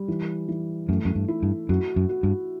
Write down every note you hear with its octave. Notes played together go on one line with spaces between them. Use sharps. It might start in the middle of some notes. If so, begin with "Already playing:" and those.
Already playing: G3
E3
E3
F#2 A3
F#2
G2
E4
G2
F#2 F#4
F#2
F#4
G2